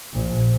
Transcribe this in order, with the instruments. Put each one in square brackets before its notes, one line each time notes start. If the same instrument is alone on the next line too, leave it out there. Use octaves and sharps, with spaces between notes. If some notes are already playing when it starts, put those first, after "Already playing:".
[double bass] A#1